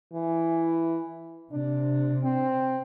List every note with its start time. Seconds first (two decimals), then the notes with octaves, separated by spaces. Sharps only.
0.12 E3
1.52 C3 D4
2.23 C4